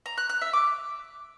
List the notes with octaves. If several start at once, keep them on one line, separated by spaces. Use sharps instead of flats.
A#5
F#6
F#6
E5
D6